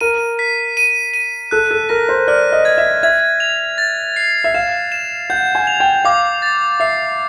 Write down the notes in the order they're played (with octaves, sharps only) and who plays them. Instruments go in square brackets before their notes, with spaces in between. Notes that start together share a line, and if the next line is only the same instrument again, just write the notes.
[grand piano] A#4 [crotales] D#7
[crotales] B6
D#7
D#7
[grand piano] A4 [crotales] F#6
[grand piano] A4
[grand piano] A#4 [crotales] A#6
[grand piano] C5
[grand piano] D5 [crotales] F6
[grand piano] D#5
[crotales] G#6
[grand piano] E5
[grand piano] E5 [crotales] G#6
[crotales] F7
A6
C7
[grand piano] E5
[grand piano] F5 [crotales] E7
[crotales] E7
[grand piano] F#5 [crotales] G6
[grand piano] G#5
[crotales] F7
[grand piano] G5
[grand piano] F5 [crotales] D6
[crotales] A6
[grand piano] E5 [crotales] C7